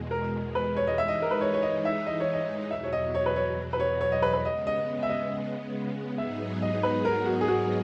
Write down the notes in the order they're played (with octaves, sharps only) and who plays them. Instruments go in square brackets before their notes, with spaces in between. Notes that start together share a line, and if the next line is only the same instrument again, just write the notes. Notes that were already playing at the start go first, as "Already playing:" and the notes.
Already playing: [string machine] E2 B2 G#3
[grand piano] A#4
B4
C#5
D#5
[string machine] E3 G#3 D#4 [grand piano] E5
[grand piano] D#5
A#4
B4
C#5
C#5
D#5
E5
D#5
C#5
D#5
[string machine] E2 B2 F#3 [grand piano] E5
[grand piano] C#5
D#5
C#5
B4
C#5
B4
C#5
C#5
D#5
B4
B4
[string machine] C#3 G#3 B3 [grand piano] D#5
[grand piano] D#5
E5
D#5
[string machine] G#2 F#3 B3 D#4 G#4 [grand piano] E5
[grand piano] D#5
B4
A#4
F#4
G#4
F#4